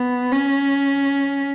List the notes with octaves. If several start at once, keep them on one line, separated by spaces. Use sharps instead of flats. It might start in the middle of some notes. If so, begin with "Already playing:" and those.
Already playing: B3
C#4